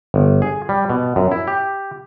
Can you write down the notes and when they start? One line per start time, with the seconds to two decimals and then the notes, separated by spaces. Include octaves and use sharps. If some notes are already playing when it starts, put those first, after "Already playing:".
0.14 G1
0.42 G#4
0.69 G3
0.90 B2
1.16 F#2
1.31 E4
1.47 G4